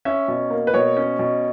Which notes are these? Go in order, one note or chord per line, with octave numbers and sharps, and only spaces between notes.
C#4 E5
B2
A#3
B4
B2 C#5
C#4
B2